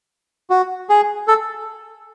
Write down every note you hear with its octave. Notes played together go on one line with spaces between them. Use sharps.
F#4
G#4
A4